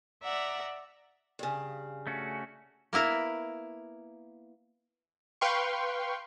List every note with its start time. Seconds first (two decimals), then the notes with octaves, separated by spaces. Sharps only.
0.22 D5 E5 F#5 A#5
1.39 G2 C#3
2.07 A3 C#4 F#4
2.93 A#3 B3 E4 A#4
5.41 B4 F5 G5 C6 C#6